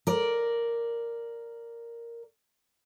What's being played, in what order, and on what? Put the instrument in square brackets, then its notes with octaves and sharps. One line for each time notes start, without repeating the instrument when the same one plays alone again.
[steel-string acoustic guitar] A#4 D5